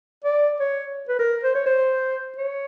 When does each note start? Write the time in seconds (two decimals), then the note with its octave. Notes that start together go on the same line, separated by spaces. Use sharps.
0.24 D5
0.60 C#5
1.09 B4
1.19 A#4
1.43 C5
1.55 C#5
1.66 C5
2.38 C#5